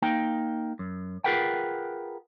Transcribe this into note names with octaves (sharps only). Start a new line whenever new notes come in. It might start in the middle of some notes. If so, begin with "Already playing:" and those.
A#3 D#4 G5
F#2
F4 G#4 A#4 B4 F#5 G5